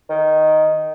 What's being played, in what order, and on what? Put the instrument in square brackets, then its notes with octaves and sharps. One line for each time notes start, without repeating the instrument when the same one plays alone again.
[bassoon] D#3